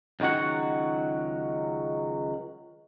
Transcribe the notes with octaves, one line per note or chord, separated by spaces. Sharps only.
C#2 D#3 F#3 F#4 F#5